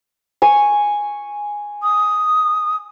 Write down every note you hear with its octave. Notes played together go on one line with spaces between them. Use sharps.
G#5 C#6
D#6